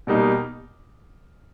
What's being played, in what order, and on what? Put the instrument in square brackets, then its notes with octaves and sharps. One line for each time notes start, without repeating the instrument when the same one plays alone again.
[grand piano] B2 G3 A#3 D#4